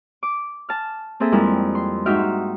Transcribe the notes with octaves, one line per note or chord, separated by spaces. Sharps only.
D6
A5 F6
A#3 C4 G#4 A4 E5
F2 G3 G#3 E4 A#4
C6
G#2 D#4 F#4 E5 G5 F6